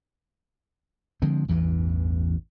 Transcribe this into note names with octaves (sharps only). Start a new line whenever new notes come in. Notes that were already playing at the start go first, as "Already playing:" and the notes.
D3 F3 G#3 C4
A1 E2 G2 E3